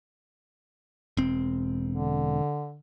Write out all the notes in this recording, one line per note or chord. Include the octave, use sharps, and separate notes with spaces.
E1 C4
D3